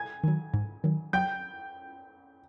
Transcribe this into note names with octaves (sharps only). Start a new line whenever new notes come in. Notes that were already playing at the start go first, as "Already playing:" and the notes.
Already playing: G#5 G#6
D#3 F#3
G#2
D#3 F#3
F#3 G5 G6